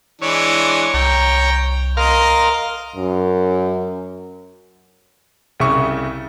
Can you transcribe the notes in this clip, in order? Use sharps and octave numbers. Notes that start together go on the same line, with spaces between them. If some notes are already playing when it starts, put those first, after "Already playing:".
E3 G#3 D4 C#5
C2 G5 A#5
A#4 D#5 F5 C6
F#2
C2 C#3 E5 C#6